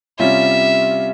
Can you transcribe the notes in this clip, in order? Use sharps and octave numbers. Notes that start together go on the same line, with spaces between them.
C3 G3 C#4 F4 E5